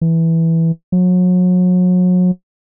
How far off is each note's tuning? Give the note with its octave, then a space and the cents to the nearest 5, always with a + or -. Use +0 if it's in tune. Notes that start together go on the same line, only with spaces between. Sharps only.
E3 -5
F#3 -35